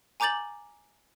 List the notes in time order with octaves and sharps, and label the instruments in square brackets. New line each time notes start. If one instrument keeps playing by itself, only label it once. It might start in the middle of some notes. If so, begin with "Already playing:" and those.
[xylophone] G#5 A#5 D6 G6 A6 F#7